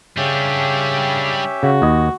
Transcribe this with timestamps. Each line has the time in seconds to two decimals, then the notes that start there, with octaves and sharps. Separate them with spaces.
0.18 C#3 G3 C#4 D4 G4 E5
1.63 C#3 F#4
1.82 D#2 D#5